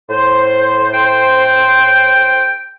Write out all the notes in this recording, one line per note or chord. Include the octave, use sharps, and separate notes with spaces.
A2 C5
G5